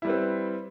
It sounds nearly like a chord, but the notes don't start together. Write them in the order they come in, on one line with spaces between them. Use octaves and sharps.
E4 G3 B4 C4